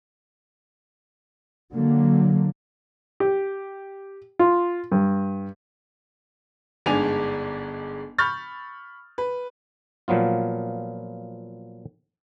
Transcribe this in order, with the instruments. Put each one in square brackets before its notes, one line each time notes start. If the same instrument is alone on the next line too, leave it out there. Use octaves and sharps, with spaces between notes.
[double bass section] D3 F#3 A#3
[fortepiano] G4
F4
G2
[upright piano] G1 G#2 G#3 D4 G#5 F7
B5 C#6 F6 G6 A6
B4
[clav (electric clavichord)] A#2 F3 F#3 B3 F4